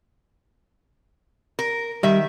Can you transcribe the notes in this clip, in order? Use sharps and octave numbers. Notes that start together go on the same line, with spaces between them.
A#4
D#3 G3 E5